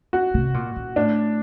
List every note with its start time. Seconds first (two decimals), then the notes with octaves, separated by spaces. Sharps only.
0.13 F#4
0.34 C3
0.54 A#2
0.76 A#2
0.96 A2 D4